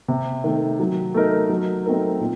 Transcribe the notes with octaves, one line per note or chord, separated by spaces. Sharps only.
C3
D#3 A3
F#3
A3 D#4 A#4
F#3
A3 C4 D#4 A#4
A#2